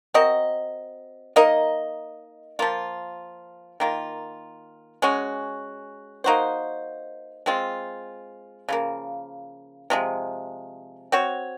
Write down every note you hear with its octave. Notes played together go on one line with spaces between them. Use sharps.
C4 F#4 A#4 D#5
A#3 D#4 A#4 D#5
F3 A#3 F4
D#3 A#3 F4
G#3 C#4 F#4
A#3 D#4 F#4 C5
G#3 C4 F4
C#3 F3 A#3
C3 F3 G#3
C4 F#4 C#5